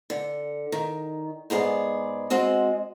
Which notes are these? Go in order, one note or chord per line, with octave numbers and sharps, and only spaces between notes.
D3
D#3
G#2 B3 G#4 D5
G#3 C4 F#4 D#5